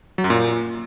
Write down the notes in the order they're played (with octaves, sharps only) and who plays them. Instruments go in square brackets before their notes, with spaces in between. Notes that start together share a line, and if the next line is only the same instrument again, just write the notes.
[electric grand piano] F#3
F#2
A#2